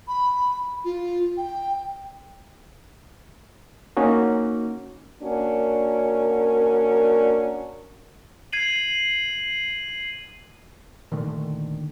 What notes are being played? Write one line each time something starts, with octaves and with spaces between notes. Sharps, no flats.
B5
F4
G5
A#3 C#4 D#4 F#4
A#3 C#4 D4 F#4 A#4
G#6 C7 D#7 F#7
A#2 D3 D#3 A3